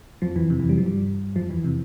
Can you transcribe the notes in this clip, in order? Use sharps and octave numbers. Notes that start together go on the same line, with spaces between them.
F2 F3
E2 E3
C3
E2 E3
G3
F3
G2 G3
F2 F3
E2 E3
C3